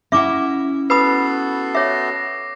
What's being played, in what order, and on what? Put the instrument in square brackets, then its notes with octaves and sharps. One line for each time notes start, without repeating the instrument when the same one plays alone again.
[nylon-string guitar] C#4 E4 F#5 [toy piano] E5 C#6 D6
[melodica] B3 F#4 A4 [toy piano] B4 B5 D#6 [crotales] C7
[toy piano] C#5 E5 [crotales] D6 A#6